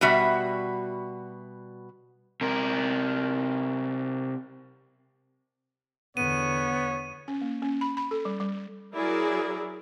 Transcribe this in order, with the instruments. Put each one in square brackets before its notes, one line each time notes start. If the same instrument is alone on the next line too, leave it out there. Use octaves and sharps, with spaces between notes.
[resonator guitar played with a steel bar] B2 G3 F#4 E5
[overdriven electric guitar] C3 A#4
[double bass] E2 D3 [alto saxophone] B3 [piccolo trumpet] C#5 [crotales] D#7
[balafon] C#4
A#3
C#4
B5
B5
A4
G3
G3
[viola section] F#3 E4 G#4 A#4 D5